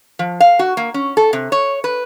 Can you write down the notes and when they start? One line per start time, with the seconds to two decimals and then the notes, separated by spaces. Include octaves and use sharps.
0.19 F3
0.40 F5
0.59 F#4
0.77 A#3
0.94 C#4
1.17 A4
1.33 C3
1.52 C#5
1.84 B4